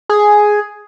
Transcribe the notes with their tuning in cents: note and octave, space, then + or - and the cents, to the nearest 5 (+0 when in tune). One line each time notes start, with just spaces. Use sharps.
G#4 +5